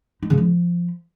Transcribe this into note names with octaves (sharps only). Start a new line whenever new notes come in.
D#4
C#3
F3